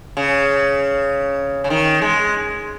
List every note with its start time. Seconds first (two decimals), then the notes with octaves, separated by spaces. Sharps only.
0.17 C#3
1.64 C#3
1.70 D#3
2.01 G#3